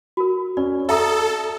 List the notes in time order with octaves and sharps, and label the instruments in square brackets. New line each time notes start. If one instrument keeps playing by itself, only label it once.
[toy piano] F#4 A#4
[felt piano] C#4 [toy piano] D5
[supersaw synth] A4 [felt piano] E5 A#5 D#6